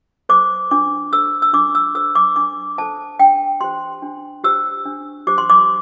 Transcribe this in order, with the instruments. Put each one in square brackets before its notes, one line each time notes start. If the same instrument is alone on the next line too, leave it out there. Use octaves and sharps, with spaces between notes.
[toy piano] A4 C5 D6
D4 D6
A4 C5 E6
E6
D4 D6
E6
A4 C5 E6
D6
D4 D6
A4 C5 A5
D4 G5
G4 C5 C6
D4
G4 C5 E6
D4
G4 C5 D6
C6
D6